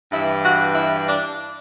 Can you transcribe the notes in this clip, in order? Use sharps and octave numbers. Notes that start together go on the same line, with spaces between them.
G2 E3 E4
F#4
E4
D4